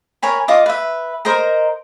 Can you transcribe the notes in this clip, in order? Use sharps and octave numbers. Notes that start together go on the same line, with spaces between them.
A#4 C#5 G#5 B5
F4 D#5 D6 D#6
B4 E5
A#4 C5 D#5 A#5